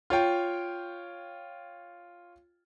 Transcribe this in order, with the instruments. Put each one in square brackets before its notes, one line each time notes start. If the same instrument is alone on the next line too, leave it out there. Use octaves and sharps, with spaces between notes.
[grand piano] F4 C#5 G5